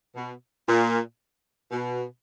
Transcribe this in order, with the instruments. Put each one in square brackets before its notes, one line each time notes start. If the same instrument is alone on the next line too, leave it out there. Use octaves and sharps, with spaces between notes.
[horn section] B2
A#2
B2